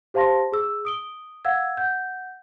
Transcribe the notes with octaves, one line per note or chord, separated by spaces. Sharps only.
G4 C5 F5 A5 C6 A#6
G#4 E6
D#6 D7 G7
F5 F#5 E6 G#6
F#5 G6